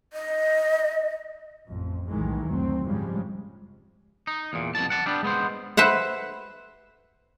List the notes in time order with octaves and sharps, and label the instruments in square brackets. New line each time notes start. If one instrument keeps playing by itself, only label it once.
[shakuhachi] D#5
[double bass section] A1 F2
B1 A2 D#3 E3 G#3 A3
F#1 D2 F#3 C4
G#2 C#3 F3 G3 G#3
[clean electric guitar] D#4
E2 A#2
C2 F2 B2 E3 A5
F#5 A5
G3 B3 D4
G#3 B3 C5
[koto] B4 C5 E5 F#5